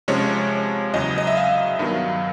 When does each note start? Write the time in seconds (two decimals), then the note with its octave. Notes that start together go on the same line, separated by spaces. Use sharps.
0.08 C3 F3 G#3 C#4 C#5
0.94 E2 C#3 F#3 D#5
1.18 D#5
1.27 E5
1.37 F5
1.79 G2 D#3 F#3 B3